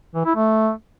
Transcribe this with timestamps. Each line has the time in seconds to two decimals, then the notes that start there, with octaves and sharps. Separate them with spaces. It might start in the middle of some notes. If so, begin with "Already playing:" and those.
0.15 E3
0.25 E4
0.36 A3